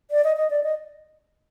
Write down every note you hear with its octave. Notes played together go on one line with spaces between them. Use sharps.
D5
D#5
D#5
D5
D#5